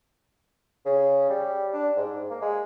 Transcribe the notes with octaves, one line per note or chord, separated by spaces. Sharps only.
C#3
G3
D4
G#2
A#3
G#3